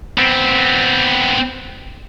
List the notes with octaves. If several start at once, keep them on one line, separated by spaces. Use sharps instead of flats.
B3 C4